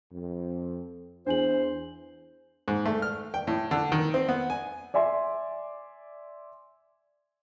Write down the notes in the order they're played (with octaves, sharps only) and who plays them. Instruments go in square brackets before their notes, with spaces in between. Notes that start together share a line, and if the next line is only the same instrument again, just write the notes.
[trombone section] F2
[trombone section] E2 [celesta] D4 G#5 F#7 [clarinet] C5
[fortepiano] G#2
A3
F6
G5
A2
D3
D#3
C4
B3
G#5
[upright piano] D5 E5 G#5 C6